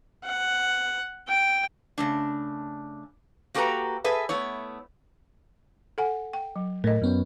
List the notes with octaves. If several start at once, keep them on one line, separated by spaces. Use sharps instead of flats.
F#5
G5
C#3 A3 D4
A#3 F#4 G4 A4 B4 A#5
G#4 A4 B4 E5
A3 B3 E4 C#5
A4 F#5 G#5
G5
F#3
A2 A#4 D#5
F#2 B3 C#4